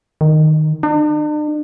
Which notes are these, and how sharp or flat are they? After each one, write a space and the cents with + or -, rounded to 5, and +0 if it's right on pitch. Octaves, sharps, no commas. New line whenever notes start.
D#3 -10
D4 +45